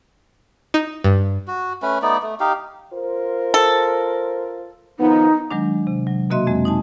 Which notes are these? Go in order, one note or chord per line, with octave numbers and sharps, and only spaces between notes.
D#4
G2
F#4
A3 C#4 B4
A3 B3 D#4 D5
A3
D#4 G4 F5
F4 A#4 C5
A4
D#3 F3 B3 D#4
D#3 F#3 G#3 D4
C3
F#3
B2 A#3 F#4 D#5 E5 C6
F2 G#3 C4
D#4 G#5 A5